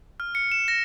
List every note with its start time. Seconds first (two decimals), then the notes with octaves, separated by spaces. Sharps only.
0.20 F6
0.35 C#7
0.52 E7
0.68 A#6